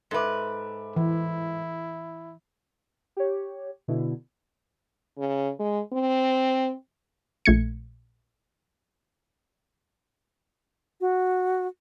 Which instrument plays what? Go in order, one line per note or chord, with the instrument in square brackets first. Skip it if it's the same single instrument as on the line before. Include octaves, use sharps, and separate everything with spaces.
[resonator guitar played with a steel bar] G#2 B4 [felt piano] A4 E5 D6
[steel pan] E3 [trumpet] E4
[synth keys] G4 C#5
B2 D3 E4
[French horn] C#3
G#3
C4
[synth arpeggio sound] A#1 A3 G#6 C#7
[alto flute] F#4